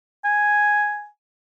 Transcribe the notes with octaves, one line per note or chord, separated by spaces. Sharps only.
G#5